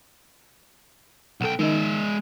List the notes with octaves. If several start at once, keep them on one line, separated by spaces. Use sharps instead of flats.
B1 A4 F#5 G5
D#3 G#3 D#4 E5